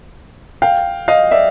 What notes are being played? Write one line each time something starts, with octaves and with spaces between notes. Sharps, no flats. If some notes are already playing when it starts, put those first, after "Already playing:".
F5 G5
D#5 F5
D5 E5